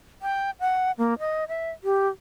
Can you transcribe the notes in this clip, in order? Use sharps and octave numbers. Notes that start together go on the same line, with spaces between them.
G5
F#5
A#3
D#5
E5
G4